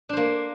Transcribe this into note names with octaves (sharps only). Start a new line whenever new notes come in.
A#3 D4 C5